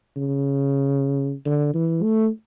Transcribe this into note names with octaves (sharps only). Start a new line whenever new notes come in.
C#3
D3
E3
A3